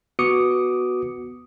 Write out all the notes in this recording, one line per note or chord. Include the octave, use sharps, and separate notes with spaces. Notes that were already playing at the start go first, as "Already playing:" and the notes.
B3 F#4 D6 D#6 C#7